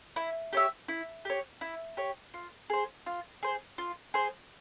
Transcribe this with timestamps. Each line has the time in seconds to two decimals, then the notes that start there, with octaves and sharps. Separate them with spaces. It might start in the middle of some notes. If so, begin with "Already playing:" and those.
0.16 E4
0.53 G4 C#5 E5
0.88 E4
1.25 G4 C#5
1.61 E4
1.97 G4 C#5
2.34 F4
2.70 G#4 C5
3.06 F4
3.43 G#4 C5
3.78 F4
4.14 G#4 C5